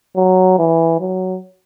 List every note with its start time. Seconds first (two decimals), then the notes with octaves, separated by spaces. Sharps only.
0.16 F#3
0.59 E3
1.00 F#3